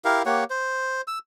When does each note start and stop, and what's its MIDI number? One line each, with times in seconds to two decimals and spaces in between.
0.05 0.23 64
0.05 0.23 67
0.05 0.23 70
0.05 0.23 77
0.26 0.44 58
0.26 0.44 67
0.26 0.44 73
0.26 0.44 78
0.50 1.01 72
1.07 1.19 88